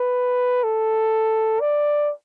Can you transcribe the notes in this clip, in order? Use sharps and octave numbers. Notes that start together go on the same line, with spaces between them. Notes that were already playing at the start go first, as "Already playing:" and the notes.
Already playing: B4
A4
D5